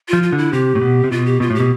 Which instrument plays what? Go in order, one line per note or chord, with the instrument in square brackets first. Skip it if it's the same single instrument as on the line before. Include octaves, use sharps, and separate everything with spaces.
[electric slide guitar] F3 [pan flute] F4
[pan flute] F4
[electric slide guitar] D3
[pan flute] E4
[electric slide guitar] C3 [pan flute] G4
[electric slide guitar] A2
B2
C3
[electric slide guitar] B2 [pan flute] F4
[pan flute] G4
[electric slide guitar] B2 [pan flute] F4
[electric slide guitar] A2
[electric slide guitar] B2 [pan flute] G4